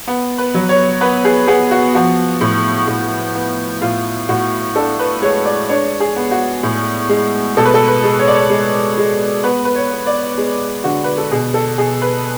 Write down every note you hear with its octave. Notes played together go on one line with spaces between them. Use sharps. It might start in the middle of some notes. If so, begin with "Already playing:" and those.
B3
B4
F#3
C#5
B3 B4
G#4
B3 G#4
F#4
F3 F#4
A2
A2
B3
A2 F4
A2 F#4
D4 A4
B4
G#3 C#5
D5
D4 C#5
G#4
B3
F#4
A2
G#3
B2 A4
B4
A4
B4
G#3
C#5
D5
C#5
G#3
G#3
B3 B4
B4
C#5
B3
D5
G#3
D3 F#4
B4
A4
B2 G#4
A4
B2 G#4
B4